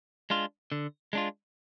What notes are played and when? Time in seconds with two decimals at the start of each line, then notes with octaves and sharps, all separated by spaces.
0.30 G#3 D4 F4
0.72 D3
1.13 G#3 D4 F4